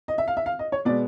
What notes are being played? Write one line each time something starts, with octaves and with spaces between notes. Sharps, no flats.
D#5
E5
F5
E5
F5
D#5
C#5
B2 G#3 B3 D5